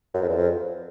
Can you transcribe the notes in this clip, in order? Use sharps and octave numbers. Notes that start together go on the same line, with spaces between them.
F#2
F2
E2
F2